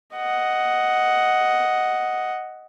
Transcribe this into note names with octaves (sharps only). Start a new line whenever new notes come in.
D#5 F#5